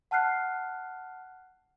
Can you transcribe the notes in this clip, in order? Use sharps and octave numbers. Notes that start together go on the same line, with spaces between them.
F#5 A5 F6 F#6 C7